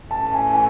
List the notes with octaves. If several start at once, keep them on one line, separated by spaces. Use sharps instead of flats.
A2 E3 A3 C#4 A5
G#5
G#5